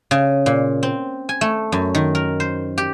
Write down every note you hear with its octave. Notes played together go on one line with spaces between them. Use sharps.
C#3
A#2
C4
G#5
A3
F#2
D#3
A#4
C5
G4